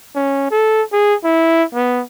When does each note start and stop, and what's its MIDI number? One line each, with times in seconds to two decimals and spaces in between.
0.15 0.50 61
0.51 0.82 69
0.93 1.15 68
1.24 1.64 64
1.74 2.03 59